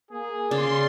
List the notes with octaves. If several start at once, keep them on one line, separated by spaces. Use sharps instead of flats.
A#3 G#4
C#3 D5 C6